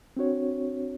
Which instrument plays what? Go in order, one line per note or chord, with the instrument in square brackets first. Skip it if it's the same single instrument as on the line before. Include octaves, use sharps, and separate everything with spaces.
[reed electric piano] C4 D4 F#4 C#5